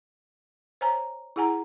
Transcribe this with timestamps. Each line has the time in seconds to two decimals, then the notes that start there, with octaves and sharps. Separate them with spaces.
0.81 C5 C#5 G#5 A#5
1.36 E4 G#4 F#5 G#5 A#5